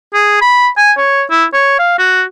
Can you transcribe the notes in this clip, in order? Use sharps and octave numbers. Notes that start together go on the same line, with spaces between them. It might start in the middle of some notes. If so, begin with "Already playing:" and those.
G#4
B5
G#5
C#5
E4
C#5
F5
F#4